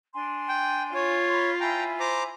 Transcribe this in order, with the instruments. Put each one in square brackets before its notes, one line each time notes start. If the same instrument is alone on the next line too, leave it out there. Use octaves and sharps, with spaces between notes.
[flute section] D4 G#5 C6
[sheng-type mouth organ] G5
[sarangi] F4 [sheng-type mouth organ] C#5
[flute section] B5 C6
[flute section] E4 G#5 B5 [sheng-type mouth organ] G5 A#5
[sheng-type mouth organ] C5 A#5 D6